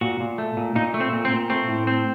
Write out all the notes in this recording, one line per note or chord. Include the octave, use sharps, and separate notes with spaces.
A#2 F#4
A#2
A3
A#2
A#2 D#4
A3
C4
A#2
C4
A#2
A3 C4
A2
C4